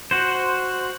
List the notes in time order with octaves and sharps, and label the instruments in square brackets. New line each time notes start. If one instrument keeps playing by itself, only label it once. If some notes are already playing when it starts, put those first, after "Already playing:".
[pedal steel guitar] F#4 C5